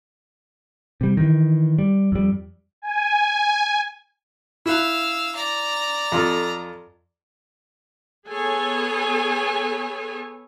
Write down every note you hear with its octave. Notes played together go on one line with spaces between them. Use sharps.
C3 G3
D#3 E3
G3
F2 G3
G#5
E4 F5 E6 F#6
D5 A#5
F2 F4 A4
B3 G#4 A4 C#5 G#5